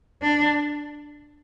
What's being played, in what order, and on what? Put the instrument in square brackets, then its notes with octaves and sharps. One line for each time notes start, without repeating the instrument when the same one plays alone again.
[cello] D4